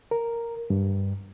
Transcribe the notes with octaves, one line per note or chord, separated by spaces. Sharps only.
A#4
G2